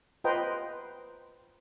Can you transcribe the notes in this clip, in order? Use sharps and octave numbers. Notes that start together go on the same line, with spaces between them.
F4 B4 C5 D#5 G5 A#5